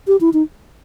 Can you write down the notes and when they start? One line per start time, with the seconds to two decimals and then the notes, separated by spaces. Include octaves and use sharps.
0.07 G4
0.21 E4
0.33 D#4